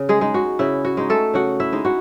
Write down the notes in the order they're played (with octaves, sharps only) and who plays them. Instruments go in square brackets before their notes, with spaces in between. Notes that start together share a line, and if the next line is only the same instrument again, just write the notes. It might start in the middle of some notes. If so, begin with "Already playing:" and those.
Already playing: [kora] C#3
G#3 G#4
G#3 D#4
F#4
C#3 E4
F#4
G#3 D#4
A3 A4
C#3 F#4 F#5
E4 E5
G#3 D#4
F#4 F#5